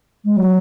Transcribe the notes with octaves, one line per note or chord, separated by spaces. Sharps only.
G#3
F#3